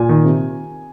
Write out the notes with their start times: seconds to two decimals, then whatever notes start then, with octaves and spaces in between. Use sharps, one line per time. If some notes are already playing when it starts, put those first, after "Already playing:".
Already playing: A#2 G#5
0.09 D#3
0.24 C3